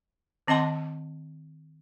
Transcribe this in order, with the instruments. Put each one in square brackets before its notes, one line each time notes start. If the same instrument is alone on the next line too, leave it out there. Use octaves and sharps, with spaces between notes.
[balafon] D#3 C4 D#5 F#5 A5 C6